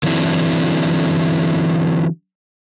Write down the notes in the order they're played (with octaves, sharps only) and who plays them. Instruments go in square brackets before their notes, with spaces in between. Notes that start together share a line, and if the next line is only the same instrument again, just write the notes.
[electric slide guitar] D3 E3 F#3 C4 D4 E4